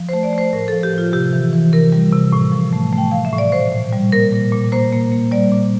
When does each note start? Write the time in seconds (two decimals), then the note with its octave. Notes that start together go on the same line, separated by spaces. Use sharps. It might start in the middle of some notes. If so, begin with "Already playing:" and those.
Already playing: F3
0.09 A3 C5
0.23 D5
0.33 A3 C5
0.53 A2 A#4
0.68 F3 A4
0.83 G4
0.93 F3 F4
1.13 C3 G4
1.33 E3
1.53 E3
1.73 C3 A#4
1.92 G3
2.13 C3
2.33 A2
2.52 F3
2.73 A3
2.92 A3
2.98 G5
3.11 A3 F5
3.25 E5
3.33 A2
3.38 D5
3.52 A#2 C5
3.72 A#2
3.92 G3
4.12 A#3 A#4
4.32 A#2
4.52 A#2
4.72 A#3 C5
4.92 A#3
5.12 A#3
5.31 G3 D5
5.51 A#2